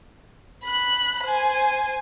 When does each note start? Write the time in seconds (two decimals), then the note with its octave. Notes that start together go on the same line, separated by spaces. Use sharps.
0.65 B5 F#6
1.24 C5 G#5